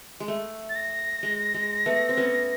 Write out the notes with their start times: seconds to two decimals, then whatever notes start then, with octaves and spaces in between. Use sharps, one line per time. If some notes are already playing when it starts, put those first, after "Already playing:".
0.20 G#3
0.28 A3
0.69 A6
0.76 A#6
1.23 G#3
1.54 G#3
1.86 A3 B3
2.09 C4
2.17 B3 C#4